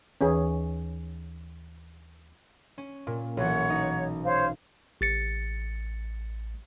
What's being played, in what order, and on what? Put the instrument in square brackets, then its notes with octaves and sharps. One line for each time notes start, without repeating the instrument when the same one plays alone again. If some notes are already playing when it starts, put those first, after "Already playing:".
[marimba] D#2 E3 B4 [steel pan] C#4 G#4
[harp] C#4
A#2
[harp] B1 E3 [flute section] C#5 F#5
[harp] D#4
[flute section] C5 C#5 F5
[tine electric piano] A1 A6 C#7